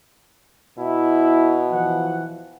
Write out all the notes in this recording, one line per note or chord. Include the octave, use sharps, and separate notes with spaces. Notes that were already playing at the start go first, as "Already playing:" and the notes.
B2 E4
E3 F3 F#5